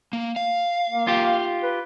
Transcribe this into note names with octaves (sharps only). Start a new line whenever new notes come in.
A#3
F5
A#3
F4 G4
B4